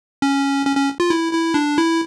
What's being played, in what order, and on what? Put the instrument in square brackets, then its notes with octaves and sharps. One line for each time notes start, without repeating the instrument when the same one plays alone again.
[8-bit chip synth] C#4
C#4
C#4
F4
E4
E4
D4
E4